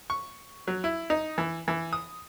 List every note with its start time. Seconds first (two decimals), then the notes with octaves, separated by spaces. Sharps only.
0.10 C#6
0.67 F#3
0.84 E4
1.10 D#4
1.38 E3
1.68 E3
1.93 D#6